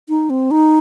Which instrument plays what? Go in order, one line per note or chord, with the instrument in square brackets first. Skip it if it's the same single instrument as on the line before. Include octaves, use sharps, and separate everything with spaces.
[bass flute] D#4
C4
D#4